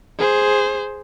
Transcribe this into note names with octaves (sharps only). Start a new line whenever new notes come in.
G#4 C5